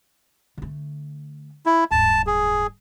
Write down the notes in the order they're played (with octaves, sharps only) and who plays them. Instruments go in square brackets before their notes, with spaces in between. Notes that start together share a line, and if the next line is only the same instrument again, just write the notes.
[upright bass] D3 A3
[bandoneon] E4
[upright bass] D1 G2 [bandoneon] A5
[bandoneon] G#4